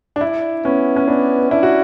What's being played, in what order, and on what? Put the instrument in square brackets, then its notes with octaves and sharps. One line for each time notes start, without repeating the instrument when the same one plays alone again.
[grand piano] D4
E4
[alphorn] B3 [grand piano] C#4
[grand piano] C#4
[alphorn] B3 [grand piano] D4
[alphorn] D4 [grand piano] E4
[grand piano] F#4